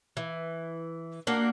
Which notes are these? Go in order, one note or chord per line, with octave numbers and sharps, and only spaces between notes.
E3
A#3 D4 F#4